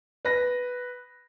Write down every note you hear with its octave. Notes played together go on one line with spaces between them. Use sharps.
B4 A#6